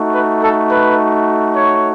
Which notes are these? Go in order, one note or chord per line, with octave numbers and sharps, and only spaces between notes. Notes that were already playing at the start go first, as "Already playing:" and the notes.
Already playing: A3 D#4 F#4
B4
A4
B4
C#5